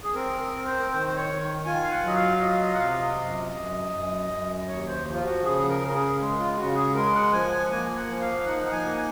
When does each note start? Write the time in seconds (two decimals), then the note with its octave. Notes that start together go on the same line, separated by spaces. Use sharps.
0.04 G#4
0.14 C4 A#4
0.40 A#4
0.52 C4
0.65 C5
0.79 A#4
0.90 D#3 C5
1.07 C5
1.15 C#5
1.28 D#3
1.66 F4 G#5
1.83 F5
1.91 F#5
2.03 F#3 D#5
2.16 F5
2.41 F4 D#5
2.53 F5
2.61 D#5
2.74 F#5
2.79 C3 F5
2.98 D#5
3.17 F#2
3.55 F#2
3.92 F#2
4.30 F#2
4.68 D#2 C#5
4.87 C5
5.06 F3
5.14 F4
5.24 F#4
5.43 C#3 G#4
5.69 A#4
5.82 C#3
5.88 A#4
5.94 G#4
6.19 G#3
6.38 F4
6.57 C#3 F#4
6.75 G#4
6.95 G#3 A#4
7.14 F#5
7.32 F3 G#5
7.51 G#5
7.64 F#5
7.70 A#3 G#5
7.85 G#5
7.96 F#5
8.08 F3
8.21 F5
8.38 F5
8.45 D#4 F#5
8.66 F#5
8.72 G#5
8.84 A#3 F#5
8.96 G#5